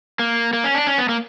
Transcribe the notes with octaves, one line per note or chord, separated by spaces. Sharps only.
A#3
A#3
C#4
D4
C#4
B3
A#3